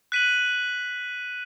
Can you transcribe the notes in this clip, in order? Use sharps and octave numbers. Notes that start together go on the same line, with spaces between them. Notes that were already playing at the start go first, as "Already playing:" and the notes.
F#6 B6 D#7 F#7